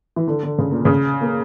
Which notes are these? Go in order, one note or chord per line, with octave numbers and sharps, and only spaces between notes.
E3
D3
D3
C#3
A#2
C#3
A#3